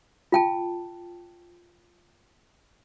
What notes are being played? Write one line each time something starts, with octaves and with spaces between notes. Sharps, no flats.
F4 G5 A5